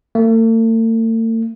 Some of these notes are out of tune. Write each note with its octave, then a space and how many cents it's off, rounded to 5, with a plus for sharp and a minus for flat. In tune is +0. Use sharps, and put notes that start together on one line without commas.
A3 +45